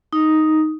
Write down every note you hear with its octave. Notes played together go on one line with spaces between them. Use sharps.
D#4